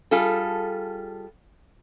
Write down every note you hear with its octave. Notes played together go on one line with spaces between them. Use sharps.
G3 F4 G#4 A4